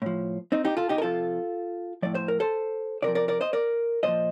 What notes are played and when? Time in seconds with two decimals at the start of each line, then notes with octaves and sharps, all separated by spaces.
0.02 A2 F3
0.52 C4 D#4
0.65 D#4 G4
0.77 F4 A4
0.89 D#4 G4
0.98 A#4
1.02 C3 F3 F4 A4
2.02 A2 F3 D5
2.15 C5
2.28 A#4
2.40 A4 C5
3.02 C3 A#4 D5
3.08 F3
3.15 A#4 D5
3.28 A#4 D5
3.41 C5 D#5
3.53 A#4 D5
4.03 A#2 F3 C5 D#5